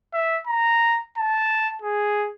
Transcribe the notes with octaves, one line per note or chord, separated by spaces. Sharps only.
E5
A#5
A5
G#4